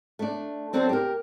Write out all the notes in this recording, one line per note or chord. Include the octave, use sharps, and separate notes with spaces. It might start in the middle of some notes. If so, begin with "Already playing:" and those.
A3 D4
F#3 C4 D4 A4 C5
G4 A#4